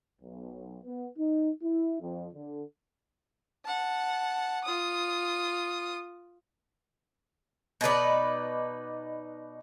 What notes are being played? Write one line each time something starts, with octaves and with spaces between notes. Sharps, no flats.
B1
B3
D#4
E4
F2
D3
F#5 A5
F4 D#6
B2 D#4 B4 D5